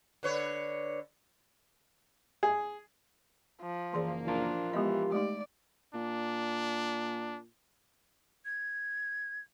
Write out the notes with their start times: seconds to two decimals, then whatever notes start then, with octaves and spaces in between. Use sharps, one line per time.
0.23 D3 B4 C#5
2.43 G#4
3.62 F3
3.94 F#1 E3 A#3 G#4 D5
4.27 F3 D4 F4 A#4
4.73 E3 G#3 B3 G4 D#5
5.13 G#3 A3 D#4 D5
5.94 A#2 D4
8.45 G#6